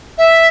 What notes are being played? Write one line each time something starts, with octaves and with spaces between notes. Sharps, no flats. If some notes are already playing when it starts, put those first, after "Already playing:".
E5